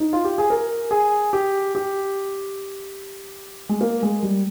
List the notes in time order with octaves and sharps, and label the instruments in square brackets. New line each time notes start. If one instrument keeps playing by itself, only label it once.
[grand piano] D#4
F4
G4
G#4
A#4
G#4
G4
G4
G#3
A#3
G#3
G3